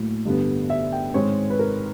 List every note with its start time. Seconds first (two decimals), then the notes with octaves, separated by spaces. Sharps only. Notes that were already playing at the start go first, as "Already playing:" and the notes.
Already playing: A2 F#3 A#3
0.25 G2 D3 G3 B3
0.70 E5
0.92 G5
1.14 G#2 D#3 G#3 C4 C#5
1.50 B4
1.59 A#4